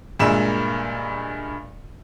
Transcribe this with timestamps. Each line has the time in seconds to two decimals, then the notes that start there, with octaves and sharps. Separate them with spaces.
0.19 G2 A#2 G#3 A#3 E5 E7